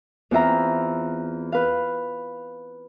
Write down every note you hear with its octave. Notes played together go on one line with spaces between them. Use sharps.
E2 C4 F4 E5 A#5
B4 F5